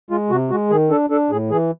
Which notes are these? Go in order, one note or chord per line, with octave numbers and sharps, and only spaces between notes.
G#3 F4
C3 F#4
G#3 F#4
D#3 G#4
D4 A4
D4 A4
A2 G#4
E3 G#4